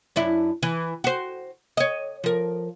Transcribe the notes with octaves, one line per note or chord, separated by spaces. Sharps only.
F#2 D4 E4
E3
F#4 C5
C#5 D#5
F3 A#4